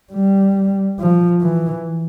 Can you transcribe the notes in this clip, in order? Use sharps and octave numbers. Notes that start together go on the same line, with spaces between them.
G3
F3
E3